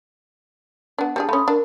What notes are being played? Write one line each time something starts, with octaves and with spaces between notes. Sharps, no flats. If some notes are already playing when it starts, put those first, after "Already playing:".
B3 D4
G3 D4 G#4 A5
A3 C#4 B5 C6 D#6
D4 A#4